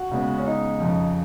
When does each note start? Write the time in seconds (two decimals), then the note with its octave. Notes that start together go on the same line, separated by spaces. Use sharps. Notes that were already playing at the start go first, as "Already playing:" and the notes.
Already playing: F#4
0.11 C#3 G#3 B3
0.38 C#4
0.47 D#4
0.80 F2 C#3 F3